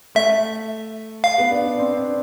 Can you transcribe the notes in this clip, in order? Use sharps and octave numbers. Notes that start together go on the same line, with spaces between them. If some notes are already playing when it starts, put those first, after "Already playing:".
A3 E5
F5
B3
D4
D4
C4
D4